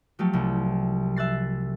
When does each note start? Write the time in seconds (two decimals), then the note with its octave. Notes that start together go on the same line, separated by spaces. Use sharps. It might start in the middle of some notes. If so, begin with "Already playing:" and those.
0.19 F3 F#3 A3 F4 G4 A4
0.33 C2
1.16 E5 F#6 A6 C7